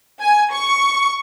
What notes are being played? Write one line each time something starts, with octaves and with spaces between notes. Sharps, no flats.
G#5
C#6